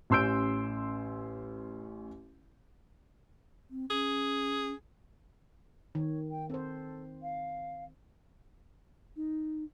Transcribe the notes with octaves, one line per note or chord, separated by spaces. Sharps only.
A1 C#4 C6 E6 G6 D7
C4
C#4 G#4
D#3 C#5
G5
C4 A4 C5
F5
D#4